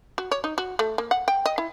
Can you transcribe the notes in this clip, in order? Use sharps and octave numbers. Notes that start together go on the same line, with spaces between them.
F#4
C#5
D#4
F#4
A3
A#3
F#5
G5
D#5
E4